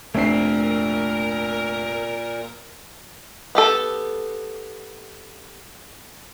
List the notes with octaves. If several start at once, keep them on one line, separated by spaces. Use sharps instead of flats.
F1 A#2 A3 C4 D4 A#4 C7
B3 G4 A4